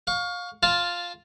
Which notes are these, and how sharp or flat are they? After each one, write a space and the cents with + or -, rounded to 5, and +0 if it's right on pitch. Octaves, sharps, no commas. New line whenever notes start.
F5 +25 C#6 +15
F4 +0 F5 +0 A5 -5